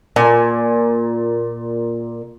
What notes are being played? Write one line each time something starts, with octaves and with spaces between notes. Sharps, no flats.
A#2 G#5